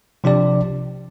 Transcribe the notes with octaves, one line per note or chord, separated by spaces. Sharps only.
C3 F3 D4 G4 D5